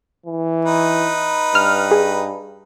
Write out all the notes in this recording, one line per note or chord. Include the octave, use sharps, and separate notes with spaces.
E3
D#4 B4
G2 F6
G#4